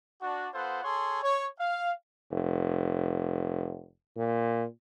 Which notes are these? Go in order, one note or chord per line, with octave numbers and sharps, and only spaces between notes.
D4 F#4
B3 F4 A4 C5 F#5
G#4 A4 C#5 C6
C#5
F5
F1
A#2